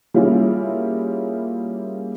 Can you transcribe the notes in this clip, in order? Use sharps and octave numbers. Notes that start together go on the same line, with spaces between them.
G3 A#3 C#4 E4 F4 G#4